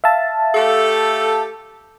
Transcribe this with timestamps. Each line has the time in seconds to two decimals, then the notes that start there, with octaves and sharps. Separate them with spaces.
0.04 E5 F5 A5
0.55 A3 G4 A4